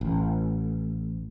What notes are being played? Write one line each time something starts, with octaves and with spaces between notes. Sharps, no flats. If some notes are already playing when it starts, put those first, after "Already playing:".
A1